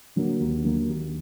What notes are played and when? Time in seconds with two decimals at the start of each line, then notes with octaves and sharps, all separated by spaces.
0.16 D3 F#3 A#3
0.40 D#2
0.64 D3 F#3 A#3
0.88 D#2